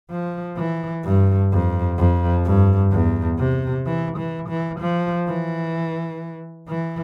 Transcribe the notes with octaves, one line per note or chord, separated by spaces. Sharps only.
F3
E3
G2
F2
F2
G2
E2
C3
E3
E3
E3
F3
E3
E3